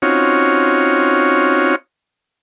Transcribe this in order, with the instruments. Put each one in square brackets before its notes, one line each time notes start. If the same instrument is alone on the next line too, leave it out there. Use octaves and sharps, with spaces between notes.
[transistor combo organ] C4 C#4 D#4 F4 F#4 C#5